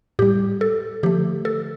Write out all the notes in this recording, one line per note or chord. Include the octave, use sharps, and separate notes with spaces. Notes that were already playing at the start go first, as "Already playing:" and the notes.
A2 G3 G4
A4
D3 F3 A3 G4
A4